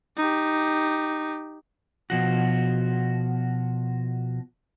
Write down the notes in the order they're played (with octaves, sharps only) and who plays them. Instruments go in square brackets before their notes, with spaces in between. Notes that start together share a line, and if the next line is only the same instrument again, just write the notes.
[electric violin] D#4 G4
[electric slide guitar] B2 F3 F#4